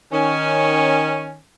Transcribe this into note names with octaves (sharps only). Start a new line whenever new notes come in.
D#3 C#4